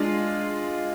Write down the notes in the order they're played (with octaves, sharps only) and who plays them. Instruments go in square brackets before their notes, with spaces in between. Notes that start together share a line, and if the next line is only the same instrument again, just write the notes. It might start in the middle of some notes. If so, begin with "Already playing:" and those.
Already playing: [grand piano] G#3 D4 F4